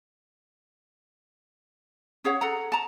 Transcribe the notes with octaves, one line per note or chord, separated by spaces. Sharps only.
C#4 G#4 C#5 F#5
A4 F#5 A#5
A5 A#5